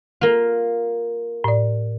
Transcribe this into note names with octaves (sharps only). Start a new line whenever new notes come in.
A#3 F4
A2 D5